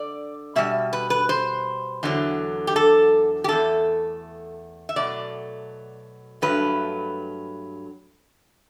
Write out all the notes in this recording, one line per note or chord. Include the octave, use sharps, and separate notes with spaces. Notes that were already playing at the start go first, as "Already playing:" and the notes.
Already playing: D3 D5
B2 G3 E5
B4
B4
C5
E2 D3 F#3
G4
A4
G4
E2 B2 A3 A4
E5
B2 F#3 A3 D5
G2 F#3 A3 B4